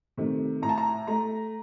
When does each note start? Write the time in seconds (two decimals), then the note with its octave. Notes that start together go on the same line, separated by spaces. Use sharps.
0.17 C3 D#3 A3
0.62 A2 A#5
0.69 A5
0.78 A#5
1.07 A3 A#5